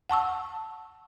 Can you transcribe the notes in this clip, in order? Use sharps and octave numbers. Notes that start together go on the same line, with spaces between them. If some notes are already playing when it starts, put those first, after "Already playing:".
F#5 A5 C#6 E6